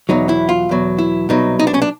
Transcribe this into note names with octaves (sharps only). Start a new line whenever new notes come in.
E2 B2 F#3 D#4
E4
F4
E2 B2 F#3
E4
C2 B2 F#3 D#4
D#4
D4
C#4
D4